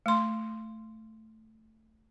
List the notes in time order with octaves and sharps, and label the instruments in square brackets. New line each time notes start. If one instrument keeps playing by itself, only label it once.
[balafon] A3 C6